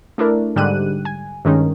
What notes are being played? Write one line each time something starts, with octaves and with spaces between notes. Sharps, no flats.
A3 D4 E4 A#4
G#2 D3 G3 G4 F#6 D#7
G#5
G2 D#3 G#3 C#4 D#4